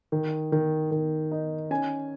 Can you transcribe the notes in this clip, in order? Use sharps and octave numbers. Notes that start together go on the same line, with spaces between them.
D#3
D#3
D#3
D#4
C#4 G#5